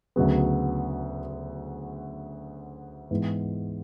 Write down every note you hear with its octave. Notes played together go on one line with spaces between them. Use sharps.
D2 C#3 F#3 B3
G#2 E3 G#3 B3